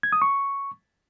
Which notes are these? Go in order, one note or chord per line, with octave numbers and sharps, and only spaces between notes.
G#6
D#6
C#6